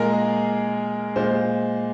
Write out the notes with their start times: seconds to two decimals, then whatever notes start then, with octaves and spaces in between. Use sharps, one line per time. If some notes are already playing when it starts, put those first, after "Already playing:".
Already playing: A#2 G#3 G#4 A#4
1.16 A#2 G#3 C5